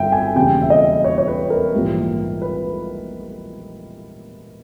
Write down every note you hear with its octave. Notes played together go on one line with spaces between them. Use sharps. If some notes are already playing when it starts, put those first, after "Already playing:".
Already playing: G1 G2 D#3 E5 G5
G#5
E1 D#2 C#3 G3 G5
E5
D#5
C#5
C#5
B4
A#4
A#1 G#2 E3 G3
B4